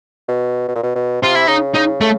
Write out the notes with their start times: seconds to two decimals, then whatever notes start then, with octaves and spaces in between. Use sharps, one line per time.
0.28 B2
0.68 B2
0.76 A#2
0.83 B2
0.95 B2
1.22 C3 F4
1.36 E4
1.48 C#3 D#4
1.75 C#3 D#4
2.01 C#3 A3